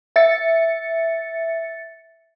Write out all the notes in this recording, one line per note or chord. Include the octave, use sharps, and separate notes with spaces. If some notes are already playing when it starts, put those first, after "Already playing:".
E5 A6 C#7